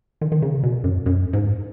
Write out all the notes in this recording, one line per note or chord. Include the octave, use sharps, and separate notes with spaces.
D#3
D#3
C#3
B2
F#2
F#2
G#2